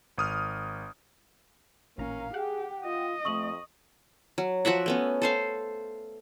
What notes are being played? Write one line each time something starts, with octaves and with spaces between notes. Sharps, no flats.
G#1 D#6 F6
A1 A#2 A#3 C#4 F5 A#5
G4 G#4 F#5 G5
F4 D#5
F2 A3 E5 C#6 D#6 F#7
F#3
F3 F#4 E5 F#5
A3 B3 C#4
A4 C5 F5